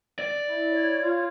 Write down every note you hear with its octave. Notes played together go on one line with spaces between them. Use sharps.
D5
E4
C#5
F4